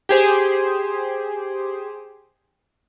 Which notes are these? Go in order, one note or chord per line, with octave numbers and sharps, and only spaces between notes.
G4 G#4 C5